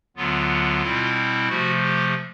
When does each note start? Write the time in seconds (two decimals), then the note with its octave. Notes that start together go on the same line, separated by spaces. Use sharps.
0.16 D2 D3 F#3 B3 F4
0.83 B2 G3 C4 E4
1.48 C3 F3 A3 F#4
1.82 G4